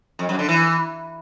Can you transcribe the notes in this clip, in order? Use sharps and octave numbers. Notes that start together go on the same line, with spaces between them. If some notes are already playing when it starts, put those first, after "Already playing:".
F2
F#2
D3
E3